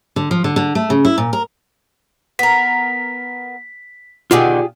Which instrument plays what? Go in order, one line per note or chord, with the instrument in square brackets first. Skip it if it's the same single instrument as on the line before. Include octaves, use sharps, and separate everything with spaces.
[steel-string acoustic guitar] D3
F3
D3
D3
A3
C#3
E4
A#2
A#4
[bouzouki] B3 A#4 [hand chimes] B6
[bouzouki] B2 D3 D#3 [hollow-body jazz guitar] F4 G4 G#4